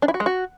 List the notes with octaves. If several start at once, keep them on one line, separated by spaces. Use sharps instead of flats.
D4
E4
F#4
G#3
F#4